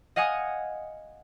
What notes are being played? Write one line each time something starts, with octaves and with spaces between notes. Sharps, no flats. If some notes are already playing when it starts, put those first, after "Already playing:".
D#5 F5 F#5 G#5 D#6